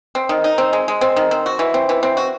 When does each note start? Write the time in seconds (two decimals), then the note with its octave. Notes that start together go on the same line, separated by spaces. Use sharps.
0.15 C4
0.29 D#3
0.44 D#4
0.58 C4
0.73 G#3
0.88 G#3
1.01 C4
1.16 D#3
1.31 C4
1.46 F#4
1.59 E3
1.74 C4
1.89 E3
2.03 C4
2.17 F#4